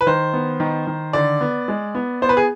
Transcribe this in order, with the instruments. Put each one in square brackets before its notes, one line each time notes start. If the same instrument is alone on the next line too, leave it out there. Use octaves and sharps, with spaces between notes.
[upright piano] B4
D#3 C5
B3
D#3
D#3
D3 D5
B3
G#3
B3
B3 C5
B4
G#4